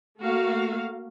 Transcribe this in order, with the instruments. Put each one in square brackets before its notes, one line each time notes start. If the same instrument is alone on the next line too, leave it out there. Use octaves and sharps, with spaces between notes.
[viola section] A3 A#3 F#4 F5